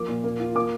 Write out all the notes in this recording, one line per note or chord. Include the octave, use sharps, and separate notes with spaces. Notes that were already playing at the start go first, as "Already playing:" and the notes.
Already playing: F3 A#3 D6
A#2
A#3
F4
A#3 D6